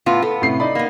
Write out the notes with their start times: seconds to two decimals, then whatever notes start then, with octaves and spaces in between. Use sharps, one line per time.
0.06 A2 B3 F4
0.22 B3 A4
0.42 A2 C3 C7
0.60 D#4 D5 B5
0.75 A#3 B3